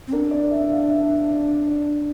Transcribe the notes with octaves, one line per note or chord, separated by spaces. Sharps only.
C4
D4 A#4
D5
E5
F5
E5
D5
D5